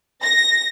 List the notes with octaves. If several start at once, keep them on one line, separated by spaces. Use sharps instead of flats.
A#6